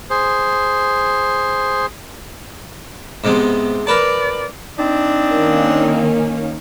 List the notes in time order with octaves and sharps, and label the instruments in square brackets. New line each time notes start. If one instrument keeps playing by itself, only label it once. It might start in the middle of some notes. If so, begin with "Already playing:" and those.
[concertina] G#4 C5
[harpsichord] G#2 C3 G#3 [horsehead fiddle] B3
[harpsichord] A#4 B4 A5 [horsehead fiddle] D5
[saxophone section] C4 D4 D#4
[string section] D#3 A#3 C#4